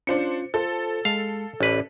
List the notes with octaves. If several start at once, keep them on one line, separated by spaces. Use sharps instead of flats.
C#4 D4 F4 C5 C#7
F4 A4 C5
G#3 F5
A1 C#4 B4 D5